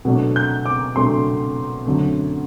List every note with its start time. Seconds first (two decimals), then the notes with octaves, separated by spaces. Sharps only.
0.05 B2 F#3 A3 D4
0.36 G6
0.66 D6
0.96 B2 F#3 A3 D4 C6
1.86 F#2 D3 A3 C4